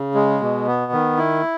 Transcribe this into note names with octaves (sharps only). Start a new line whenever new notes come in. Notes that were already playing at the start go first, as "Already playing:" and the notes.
Already playing: C#3
G#3
B2
B3
D#3
E4